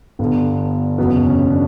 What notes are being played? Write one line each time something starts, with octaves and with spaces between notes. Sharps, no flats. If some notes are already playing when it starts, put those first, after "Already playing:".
G1 G2 D3 B3
F#1 E2 B2 F#3 B3
C#4
D4